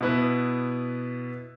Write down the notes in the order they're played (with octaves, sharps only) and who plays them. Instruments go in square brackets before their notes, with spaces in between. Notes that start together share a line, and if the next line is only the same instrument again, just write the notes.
[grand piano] B2 B3 E4 B4